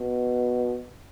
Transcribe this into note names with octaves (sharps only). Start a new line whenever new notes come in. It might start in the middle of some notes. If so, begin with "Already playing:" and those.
Already playing: B2